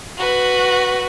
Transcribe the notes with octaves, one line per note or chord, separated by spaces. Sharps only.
F#4 B4